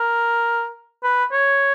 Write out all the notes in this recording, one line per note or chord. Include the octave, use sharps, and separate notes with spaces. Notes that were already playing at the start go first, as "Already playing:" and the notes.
Already playing: A#4
B4
C#5